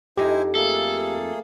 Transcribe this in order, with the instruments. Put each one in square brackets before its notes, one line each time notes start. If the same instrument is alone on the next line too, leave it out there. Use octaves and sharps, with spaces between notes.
[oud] F2 D#4 [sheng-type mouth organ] E4 C5 G#5 [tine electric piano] G4
[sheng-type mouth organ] A3 A#3 G#4 [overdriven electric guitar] A4